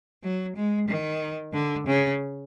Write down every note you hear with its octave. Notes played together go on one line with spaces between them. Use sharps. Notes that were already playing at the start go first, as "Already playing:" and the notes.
F#3
G#3
D#3
D3
C#3